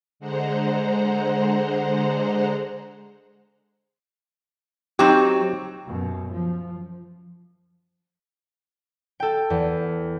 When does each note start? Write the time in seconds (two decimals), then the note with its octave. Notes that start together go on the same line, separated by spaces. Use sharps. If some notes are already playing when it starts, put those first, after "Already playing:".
0.19 D3 G#3 C5 F#5 A#5
4.99 F#3 C4 D#4 G4
5.88 F#2 B2
6.34 F3
9.20 A4 G5
9.50 E2